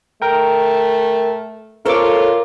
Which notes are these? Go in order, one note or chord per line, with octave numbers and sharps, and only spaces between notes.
A3 A#4 G5
F4 A4 A#4 C5 C#5 D6